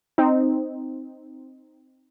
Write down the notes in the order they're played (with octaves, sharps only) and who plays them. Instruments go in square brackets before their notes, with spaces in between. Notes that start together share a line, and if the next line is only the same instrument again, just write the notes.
[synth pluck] C4 D#4